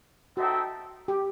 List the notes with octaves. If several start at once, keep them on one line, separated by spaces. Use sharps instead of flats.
C4 D#4 F#4 A4 E5 G5
G4